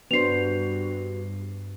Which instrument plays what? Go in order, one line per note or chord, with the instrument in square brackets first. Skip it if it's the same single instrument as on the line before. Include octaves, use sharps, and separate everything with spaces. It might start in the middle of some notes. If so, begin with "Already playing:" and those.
[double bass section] G2 [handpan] B3 D4 C5 [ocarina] F#4 [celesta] C7 F7